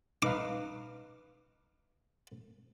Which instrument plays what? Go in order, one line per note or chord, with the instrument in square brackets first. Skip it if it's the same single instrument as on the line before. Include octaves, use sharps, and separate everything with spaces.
[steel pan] D#4 B4 F5 [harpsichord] D6